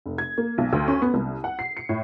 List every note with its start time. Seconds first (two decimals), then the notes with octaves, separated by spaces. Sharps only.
0.06 F1
0.18 G#6
0.38 A#3
0.58 B1
0.73 D2
0.88 C#4
1.02 B3
1.14 C2
1.44 F#5
1.59 C7
1.77 C#7
1.89 A2